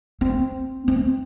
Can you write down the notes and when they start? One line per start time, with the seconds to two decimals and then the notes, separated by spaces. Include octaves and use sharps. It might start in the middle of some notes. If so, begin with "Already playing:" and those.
0.21 C4
0.88 C4